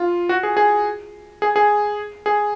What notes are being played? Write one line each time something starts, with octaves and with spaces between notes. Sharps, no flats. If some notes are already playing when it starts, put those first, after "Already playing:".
Already playing: F4
F#4
G#4
G#4
G#4
G#4
G#4